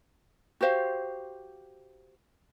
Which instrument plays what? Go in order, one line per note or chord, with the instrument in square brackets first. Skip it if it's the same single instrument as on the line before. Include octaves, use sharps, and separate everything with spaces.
[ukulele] F#4 G4 C5 F5